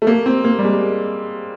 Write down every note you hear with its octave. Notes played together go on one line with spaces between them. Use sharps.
A3
A#3
C4
A#3
G3
G#3